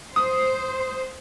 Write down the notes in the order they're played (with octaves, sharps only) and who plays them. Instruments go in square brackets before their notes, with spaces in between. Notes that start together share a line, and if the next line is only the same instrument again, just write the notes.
[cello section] C5 [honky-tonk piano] D#6